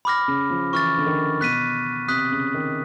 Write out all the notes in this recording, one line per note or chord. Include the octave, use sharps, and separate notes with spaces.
B5 D6 F6 A#6
C#3
F3
E3 C#6 F6 A6
D3
D#3
B2 F#6 B6 D#7
C3 D#6 F#6 B6
C#3
D#3